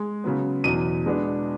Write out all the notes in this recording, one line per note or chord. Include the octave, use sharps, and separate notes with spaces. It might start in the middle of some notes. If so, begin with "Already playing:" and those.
Already playing: G#3
C#3 F#3 B3
E2 B2 F#3 D#7
B2 G#3 B3 D4